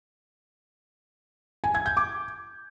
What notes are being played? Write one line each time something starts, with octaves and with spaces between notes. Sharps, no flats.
G#5
G#6
G6
D6